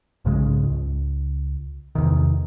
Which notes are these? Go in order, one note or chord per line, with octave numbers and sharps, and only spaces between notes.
B1 G#2 C#3 G#3
C#2
E2 C3 D#3